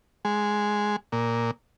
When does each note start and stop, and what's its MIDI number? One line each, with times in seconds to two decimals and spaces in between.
0.25 0.96 56
1.12 1.51 46